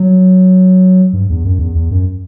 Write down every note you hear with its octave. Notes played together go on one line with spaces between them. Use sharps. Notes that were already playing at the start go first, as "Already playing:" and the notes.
Already playing: F#3
G2
E2
F#2
E2
E2
F#2